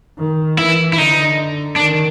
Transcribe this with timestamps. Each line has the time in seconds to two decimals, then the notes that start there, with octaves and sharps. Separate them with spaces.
0.19 D#3
0.58 E3 E4
0.93 E4
0.98 D3 D#4
1.76 D#3 D4